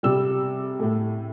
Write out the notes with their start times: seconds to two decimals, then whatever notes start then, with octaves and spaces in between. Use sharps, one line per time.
0.03 C3 G3 E6
0.80 A2 A3